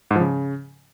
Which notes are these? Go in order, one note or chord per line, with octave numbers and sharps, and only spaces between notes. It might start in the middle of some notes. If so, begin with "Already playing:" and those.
G#2
F3
C#3